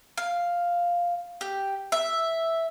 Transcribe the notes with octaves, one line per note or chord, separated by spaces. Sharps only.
F5
G4
E5